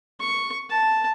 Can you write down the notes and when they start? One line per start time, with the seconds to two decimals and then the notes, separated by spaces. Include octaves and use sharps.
0.20 C#6
0.70 A5